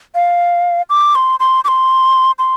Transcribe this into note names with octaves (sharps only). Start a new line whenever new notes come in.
F5
D6
C6
C6
D6
C6
C6